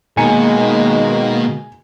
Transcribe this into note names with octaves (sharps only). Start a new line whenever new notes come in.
B2 D#3 G#3 A#3 G#5 C#7